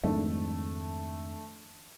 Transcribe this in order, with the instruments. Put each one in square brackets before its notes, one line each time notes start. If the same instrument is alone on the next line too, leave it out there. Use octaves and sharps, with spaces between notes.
[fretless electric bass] F2 G#2 D#3 [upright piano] A3 D4